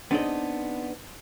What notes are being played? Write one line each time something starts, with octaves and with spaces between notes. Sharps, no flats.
B3 C4 D4 D#4 G#4 D#5